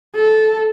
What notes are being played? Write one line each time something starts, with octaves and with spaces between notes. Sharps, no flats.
A4